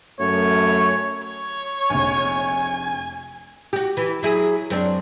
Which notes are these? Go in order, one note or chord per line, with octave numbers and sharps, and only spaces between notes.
F#2 A3 C#5
C#5
F1 A#1 G#5
F#4 G4
E3
F#3 E4 G#4
F#2 C4 D4